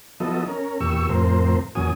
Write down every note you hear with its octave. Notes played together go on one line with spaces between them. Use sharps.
F3 F#3 B3 E4 A4 D#5
C#4 A#4
E2 A#2 G4 C#6 E6
F2 A2 C4 A#4 C5
E2 A#2 F#3 C#4 G#5 D#6